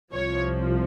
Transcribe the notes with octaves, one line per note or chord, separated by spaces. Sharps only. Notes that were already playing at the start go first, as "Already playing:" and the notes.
C2 C3 F3 C#5